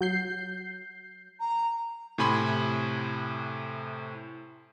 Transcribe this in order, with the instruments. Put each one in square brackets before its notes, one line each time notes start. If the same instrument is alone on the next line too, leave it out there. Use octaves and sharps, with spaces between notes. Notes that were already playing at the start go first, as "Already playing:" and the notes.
[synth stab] F#3 G6 C7
[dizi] A#5
[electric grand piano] A2 C3 G#5 B5 C6